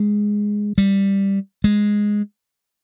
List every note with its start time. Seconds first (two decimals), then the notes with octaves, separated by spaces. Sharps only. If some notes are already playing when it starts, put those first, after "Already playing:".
Already playing: G#3
0.78 G3
1.64 G#3